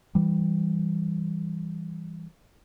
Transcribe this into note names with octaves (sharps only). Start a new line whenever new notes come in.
E3 G3